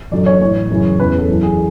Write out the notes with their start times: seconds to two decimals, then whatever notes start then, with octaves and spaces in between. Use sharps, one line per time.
0.11 F#2 D3 F#3 D5
0.26 C#5
0.41 A2 E3 C#5
0.70 F#2 C#3 E3
0.99 E2 C#3 E3 B4
1.18 A4
1.29 F#2 E3
1.43 G#4